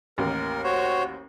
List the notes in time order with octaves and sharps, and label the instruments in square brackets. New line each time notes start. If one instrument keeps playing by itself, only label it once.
[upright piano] A1 D#2 [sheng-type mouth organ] A#4
[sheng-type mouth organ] F#4 C5 C#5